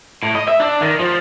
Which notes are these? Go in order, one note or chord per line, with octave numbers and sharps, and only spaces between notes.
A2
D#5
E5
D4
D#3
F3